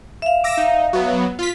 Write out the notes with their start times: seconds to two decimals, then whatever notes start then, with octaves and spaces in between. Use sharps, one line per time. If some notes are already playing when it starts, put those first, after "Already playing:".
0.22 E5 F5
0.44 D6 E6 A#6
0.57 D#4
0.93 F#3 B3
1.39 F4 B6